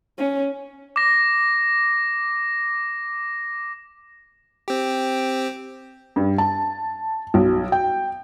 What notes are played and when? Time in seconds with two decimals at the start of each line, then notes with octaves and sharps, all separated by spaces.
0.18 C#4
0.96 D6 A#6
4.68 C4 G4
6.16 G2
6.38 A5
7.34 B1
7.72 G5